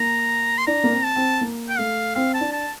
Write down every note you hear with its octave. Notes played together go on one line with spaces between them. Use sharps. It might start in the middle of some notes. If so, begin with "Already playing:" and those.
Already playing: A#3 A#5
C6
D4 A#5
A#3
C4
A5
C4
A#3
G5
A3 F5
C4 F5
A5
D4
A5